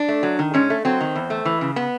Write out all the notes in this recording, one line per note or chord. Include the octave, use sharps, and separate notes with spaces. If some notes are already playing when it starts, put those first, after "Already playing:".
Already playing: D4
A3
F#3
D#3
G#2 C#4
A3
F#3 C4
D#3
E2
A3
E3
C#3
B3